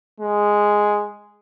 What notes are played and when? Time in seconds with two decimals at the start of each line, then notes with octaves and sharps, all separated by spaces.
0.20 G#3